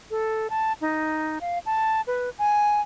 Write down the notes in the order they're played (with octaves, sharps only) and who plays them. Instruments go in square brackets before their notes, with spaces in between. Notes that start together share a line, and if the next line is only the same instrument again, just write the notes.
[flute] A4
A5
D#4
F5
A5
B4
G#5